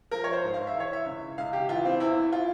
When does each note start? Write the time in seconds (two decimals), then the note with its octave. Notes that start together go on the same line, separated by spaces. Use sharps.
0.11 F3 A#4
0.24 C#5
0.33 C5
0.43 G#2
0.54 F5
0.67 E5
0.75 E3 C#5
0.93 E5
1.06 C#2
1.38 C#2 F5
1.53 G4
1.69 E3 F4
1.85 C4
2.00 E2 E4
2.32 F4